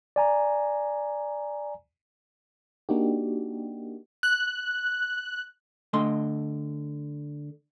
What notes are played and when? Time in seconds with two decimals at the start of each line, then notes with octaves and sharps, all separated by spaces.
0.16 D5 G#5 A#5
2.89 A#3 D4 D#4 F#4 G4
4.23 F#6
5.93 D3 A3 D#5 C6